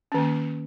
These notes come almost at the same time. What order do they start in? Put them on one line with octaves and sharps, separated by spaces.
C#4 D#3 A#3